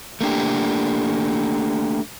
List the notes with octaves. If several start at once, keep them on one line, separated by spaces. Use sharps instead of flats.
A3 A#3 D4 G4